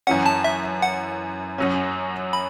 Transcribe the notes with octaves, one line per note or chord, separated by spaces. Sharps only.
F#2 E3 C#4 F#5
A5
E5
F#5
F#2 F#3 C#4
B5